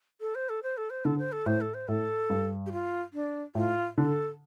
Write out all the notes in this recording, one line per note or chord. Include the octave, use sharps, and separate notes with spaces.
A4
C5
A4
C5
A4
C5
D3 A4
C5
A4
A2 C5
A4
C5
A2 A4
G2
G4
F4
D4
A2 F4
D3 A4